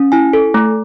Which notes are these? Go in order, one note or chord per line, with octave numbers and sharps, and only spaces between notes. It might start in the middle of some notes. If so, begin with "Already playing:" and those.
Already playing: C#4
E4 G#5
A4
A3